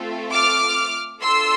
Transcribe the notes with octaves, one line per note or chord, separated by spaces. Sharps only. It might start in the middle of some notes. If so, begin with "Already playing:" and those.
Already playing: A3 C4 F4 A4
D6 F6
D4 F4 A4 C6 E6